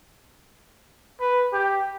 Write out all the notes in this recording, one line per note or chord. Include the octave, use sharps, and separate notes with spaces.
B4
G4